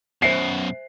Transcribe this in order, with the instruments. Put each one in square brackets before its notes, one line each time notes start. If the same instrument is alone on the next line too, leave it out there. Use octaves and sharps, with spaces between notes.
[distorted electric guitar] F#2 B2 [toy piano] C5 E5 G#5 [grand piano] C7